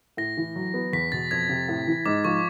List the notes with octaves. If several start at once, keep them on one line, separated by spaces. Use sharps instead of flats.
A2 A#6
E3
F#3
B3
E2 B6
B2 A6
F2 G#6
C3
A2
E3
G#2 D6
F3 C#6